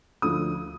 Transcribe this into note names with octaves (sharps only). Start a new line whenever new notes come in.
D2 D3 F3 D#6